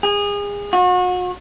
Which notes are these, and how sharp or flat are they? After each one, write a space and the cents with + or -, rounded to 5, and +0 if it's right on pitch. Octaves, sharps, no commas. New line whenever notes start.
G#4 -30
F#4 -35